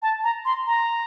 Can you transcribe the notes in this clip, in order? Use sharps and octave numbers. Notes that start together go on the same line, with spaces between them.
A5
A#5
C6
A#5